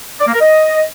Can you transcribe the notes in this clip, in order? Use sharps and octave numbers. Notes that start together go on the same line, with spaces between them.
D5
A#3
A#4
D#5